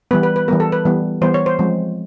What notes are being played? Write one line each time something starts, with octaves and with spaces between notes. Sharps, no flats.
E3 G3 B3 B4
B4
B4
E3 G3 B3 A#4
A4
B4
E3 G3 B3
E3 G3 B3 C5
C#5
C5
F3 G#3 C4